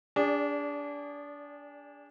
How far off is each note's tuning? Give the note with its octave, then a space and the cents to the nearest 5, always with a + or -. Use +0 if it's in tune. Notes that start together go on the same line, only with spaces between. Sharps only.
D4 -25 G#4 -35 D5 +0